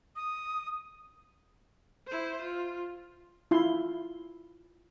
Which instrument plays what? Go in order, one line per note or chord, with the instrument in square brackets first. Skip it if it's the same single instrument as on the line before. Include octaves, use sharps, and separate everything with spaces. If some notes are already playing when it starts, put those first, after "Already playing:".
[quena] D#6
[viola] E4 C5
F4
[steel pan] E4 F4 C6